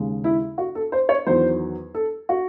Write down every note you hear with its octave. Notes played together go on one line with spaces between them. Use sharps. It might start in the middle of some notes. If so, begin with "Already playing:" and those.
Already playing: D#2 C#3 G#3
E4
F#4
A4
C5
C#5
E2 D#3 F#3 C5
A4
F#4